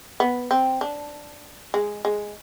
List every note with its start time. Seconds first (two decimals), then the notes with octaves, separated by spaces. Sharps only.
0.20 B3
0.51 C4
0.81 D4
1.74 G#3
2.05 G#3